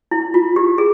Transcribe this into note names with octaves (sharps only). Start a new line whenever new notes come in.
E4
F4
G4
G#4